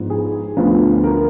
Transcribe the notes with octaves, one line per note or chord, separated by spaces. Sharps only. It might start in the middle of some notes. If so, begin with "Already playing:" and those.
Already playing: G#2 F3 B3 D4
G#4
D2 D3 F3 B3
A#4